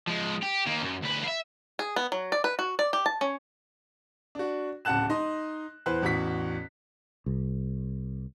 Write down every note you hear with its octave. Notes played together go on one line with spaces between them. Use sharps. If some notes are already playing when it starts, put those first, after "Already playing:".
F3 G#3
G4
D#3 A#3
F#2
D2 B4
E5 F5
G#4
B3
F#3
D5
B4
F#4
D5
G4
A5
C#4
D4 F#4
D1 C#3 F#5 A5 F#6 E7
D#4 D#5 C6
E2 E3 B4 C5 C6 F#6
A1 E2 F#4 B6
C2